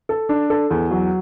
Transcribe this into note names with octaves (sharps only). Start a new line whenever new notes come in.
A4
D4
A4
E2
F#3